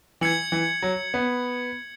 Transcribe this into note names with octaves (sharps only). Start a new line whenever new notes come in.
E3 G#6 C#7 F#7
E3
F#3
B3